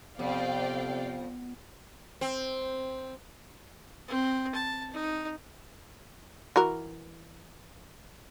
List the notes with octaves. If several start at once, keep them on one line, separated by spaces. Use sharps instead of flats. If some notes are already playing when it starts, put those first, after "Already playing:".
F2 C3 B3 D5 F5 G5
C4
C4
A5
D#4
E3 F#4 A#4